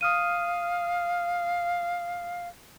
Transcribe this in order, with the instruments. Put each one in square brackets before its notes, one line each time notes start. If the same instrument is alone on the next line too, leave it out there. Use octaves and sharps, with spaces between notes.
[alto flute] F5 [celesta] D#6 F6 D#7